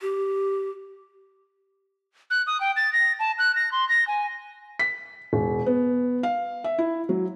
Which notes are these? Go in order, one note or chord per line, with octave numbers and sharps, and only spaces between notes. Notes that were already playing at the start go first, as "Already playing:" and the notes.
G4
F#6
D#6
G5
A6
A#6
A5
F#6
A#6
C6
A#6
G#5
B6
E1
B3
F5
E5
E4
F#3